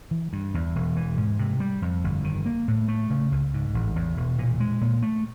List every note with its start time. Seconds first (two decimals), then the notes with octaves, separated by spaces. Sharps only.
0.11 E3
0.33 G2
0.54 E2
0.75 E1
0.96 E3
1.17 G#2
1.39 C3
1.60 G3
1.82 F2
2.04 G1
2.24 D#3
2.46 A#3
2.68 A2
2.88 A3
3.10 C#3
3.32 C#2
3.54 G#2
3.74 A1
3.96 E2
4.17 E1
4.38 A#2
4.60 G#3
4.81 A#2
5.02 A3